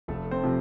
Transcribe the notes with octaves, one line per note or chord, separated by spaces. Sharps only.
F1 A3 A4
C4 C5
C3 F3